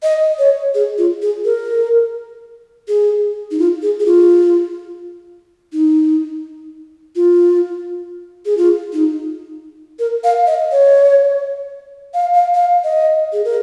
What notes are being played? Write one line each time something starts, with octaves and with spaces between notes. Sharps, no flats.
D#5
C#5
G#4
F4
G#4
A#4
G#4
D#4
F4
G#4
G#4
F4
D#4
F4
G#4
F4
D#4
A#4
F5
D#5
C#5
F5
F5
F5
D#5
G#4
A#4